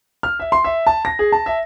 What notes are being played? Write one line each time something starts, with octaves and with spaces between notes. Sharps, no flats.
F6
E5
C6
E5
A5
A#6
G#4
A5
E5